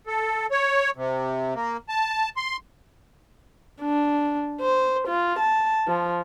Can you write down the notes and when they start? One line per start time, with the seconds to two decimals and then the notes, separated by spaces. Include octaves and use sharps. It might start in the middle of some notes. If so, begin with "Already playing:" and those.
0.07 A4
0.51 C#5
0.96 C3
1.54 A#3
1.89 A5
2.37 C6
3.81 D4
4.61 C5
5.08 F4
5.39 A5
5.87 F3